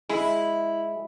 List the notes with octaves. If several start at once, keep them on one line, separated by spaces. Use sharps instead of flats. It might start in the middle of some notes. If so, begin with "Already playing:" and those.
G#3 E4